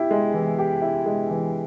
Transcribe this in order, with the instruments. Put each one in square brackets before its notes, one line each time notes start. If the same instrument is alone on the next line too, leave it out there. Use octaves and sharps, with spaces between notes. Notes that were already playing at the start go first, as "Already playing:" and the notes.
Already playing: [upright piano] E4 G4
G#3
E3
G4
E4
G#3
E3